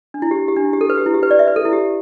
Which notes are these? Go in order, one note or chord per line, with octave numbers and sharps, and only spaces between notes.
D4
E4
G4
E4
G4
D4
E4
G4
A4
B4
G4
E4
G4
B4
D5
E5
B4
A4
E4
G4